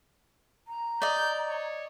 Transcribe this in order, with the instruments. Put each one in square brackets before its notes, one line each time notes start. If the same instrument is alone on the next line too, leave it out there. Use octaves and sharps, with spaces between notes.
[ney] A#5
[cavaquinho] D5 D#5 [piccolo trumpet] G6
[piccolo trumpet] C#5